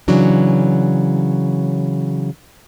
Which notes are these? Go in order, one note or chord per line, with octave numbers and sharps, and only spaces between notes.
C#3 E3 F#3 D4